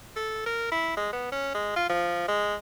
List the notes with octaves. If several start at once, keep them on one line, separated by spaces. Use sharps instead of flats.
A4
A#4
E4
G#3
B3
C#4
G#3
F4
F3
G#3